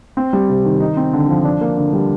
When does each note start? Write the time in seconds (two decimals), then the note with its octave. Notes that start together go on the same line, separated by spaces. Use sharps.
0.17 C4
0.33 G3
0.49 C3
0.65 D#3
0.80 D#4
0.97 C4
1.13 D3
1.28 F3
1.45 D4
1.61 A#3
1.77 D3
1.93 G3